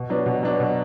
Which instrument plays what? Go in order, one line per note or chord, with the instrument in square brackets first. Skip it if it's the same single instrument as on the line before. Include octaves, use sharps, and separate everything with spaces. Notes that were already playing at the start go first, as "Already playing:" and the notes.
Already playing: [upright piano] B2
F#3 B3 D4
B2
F#3 B3 D4
B2